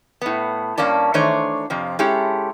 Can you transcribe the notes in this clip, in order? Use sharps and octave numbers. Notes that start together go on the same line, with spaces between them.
A2 B3
G2 A#3 C#4 D5 A5
D#3 E3 A3 D4 C5 C#5
F2 C3 F3
G#3 C#4 E4 G4 A4